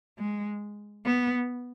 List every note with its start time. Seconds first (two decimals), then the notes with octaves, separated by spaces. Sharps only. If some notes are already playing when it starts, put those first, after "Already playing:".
0.18 G#3
1.05 B3